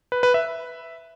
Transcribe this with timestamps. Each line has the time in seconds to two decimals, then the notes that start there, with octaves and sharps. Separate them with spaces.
0.12 B4
0.23 B4
0.34 E5